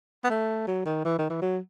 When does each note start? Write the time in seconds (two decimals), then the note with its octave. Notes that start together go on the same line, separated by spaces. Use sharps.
0.24 B3
0.30 A3
0.67 F#3
0.86 D#3
1.05 E3
1.19 D#3
1.30 E3
1.42 F#3